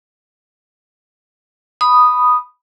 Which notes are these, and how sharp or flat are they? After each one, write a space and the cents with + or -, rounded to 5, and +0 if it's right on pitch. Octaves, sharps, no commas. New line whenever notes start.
B5 +0 D#6 -5